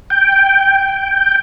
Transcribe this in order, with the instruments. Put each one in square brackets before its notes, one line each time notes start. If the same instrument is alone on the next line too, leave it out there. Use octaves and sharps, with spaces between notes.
[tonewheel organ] G5